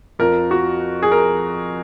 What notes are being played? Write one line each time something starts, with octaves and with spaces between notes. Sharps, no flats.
F2 F3 A#4
F#4
G#4
A#4